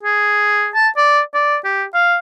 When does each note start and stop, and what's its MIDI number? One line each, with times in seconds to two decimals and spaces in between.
0.03 0.69 68
0.74 0.88 81
0.97 1.20 74
1.34 1.57 74
1.64 1.84 67
1.94 2.17 77